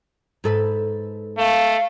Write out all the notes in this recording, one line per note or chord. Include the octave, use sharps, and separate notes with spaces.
G#2 A4 B4
A3 F5